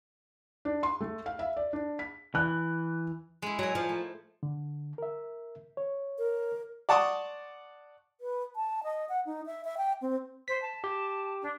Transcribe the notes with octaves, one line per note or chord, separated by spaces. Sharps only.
D4
C6
A3
F5
E5
D5
D4
B6
E3 F#6
G#3 E4
F#3 A#4 G#5 A#5
F3
A3
D3
A#4 E5
C#5
A#4
D5 F#5 A5 C6 C#6 D#6
B4
A5
D#5
F#5
D#4
E5
E5
G5
C4
C5 B6
A5
G4 G5
D4